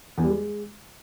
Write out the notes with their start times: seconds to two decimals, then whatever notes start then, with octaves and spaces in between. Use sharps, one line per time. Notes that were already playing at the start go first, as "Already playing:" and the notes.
0.18 E2
0.24 G3
0.30 G#3